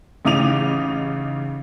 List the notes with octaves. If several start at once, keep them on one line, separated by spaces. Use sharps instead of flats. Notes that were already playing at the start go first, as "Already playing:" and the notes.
A1 C#3 D#4 D6 D#7 F7